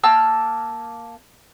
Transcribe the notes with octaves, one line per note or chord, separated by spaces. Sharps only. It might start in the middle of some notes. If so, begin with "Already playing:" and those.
A#3 A5 E6 F6